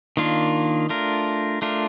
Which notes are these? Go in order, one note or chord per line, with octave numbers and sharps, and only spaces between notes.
D#3 A#3 D4 F4
A3 D4 F4 A#4
A3 D4 F4 A#4